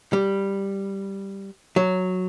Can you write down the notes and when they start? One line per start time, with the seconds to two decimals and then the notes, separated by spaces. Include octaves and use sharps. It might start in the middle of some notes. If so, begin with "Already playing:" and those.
0.13 G3
1.76 F#3